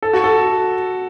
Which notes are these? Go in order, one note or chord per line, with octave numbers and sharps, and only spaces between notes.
A4
F#4
A4